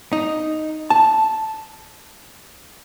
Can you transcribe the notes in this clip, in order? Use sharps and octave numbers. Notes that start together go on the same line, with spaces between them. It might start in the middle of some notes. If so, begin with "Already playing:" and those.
D#4
A5